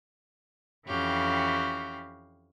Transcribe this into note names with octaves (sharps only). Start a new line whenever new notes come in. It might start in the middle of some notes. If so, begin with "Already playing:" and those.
F2 E3 C#4 F#4 G4 F5